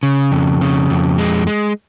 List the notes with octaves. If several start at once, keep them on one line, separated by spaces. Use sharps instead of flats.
C#3
F2
C#3
F2
G#3
G#3